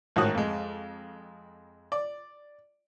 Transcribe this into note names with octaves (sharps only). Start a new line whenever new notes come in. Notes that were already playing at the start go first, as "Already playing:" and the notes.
A1 G#2 D#3 F#4 D#6 F#6
F2 G#3
D5